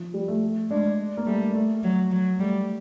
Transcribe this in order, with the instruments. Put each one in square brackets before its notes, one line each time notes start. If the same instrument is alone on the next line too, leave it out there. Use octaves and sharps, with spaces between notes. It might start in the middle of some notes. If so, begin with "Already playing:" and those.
Already playing: [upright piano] F3
G3
A3
[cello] G#3 [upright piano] D4
[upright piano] A#3
[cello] G3 [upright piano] A3
[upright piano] A3
[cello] F#3
F#3
[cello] G3 [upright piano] A3